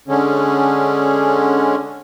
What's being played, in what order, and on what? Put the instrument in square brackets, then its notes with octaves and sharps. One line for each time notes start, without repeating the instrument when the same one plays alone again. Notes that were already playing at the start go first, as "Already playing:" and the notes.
[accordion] D3 G#3 C#4